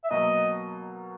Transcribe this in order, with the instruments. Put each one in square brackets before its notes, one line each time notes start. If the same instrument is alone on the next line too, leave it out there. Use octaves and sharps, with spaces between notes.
[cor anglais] E5
[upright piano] B2 F#3 A#3 [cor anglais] D#5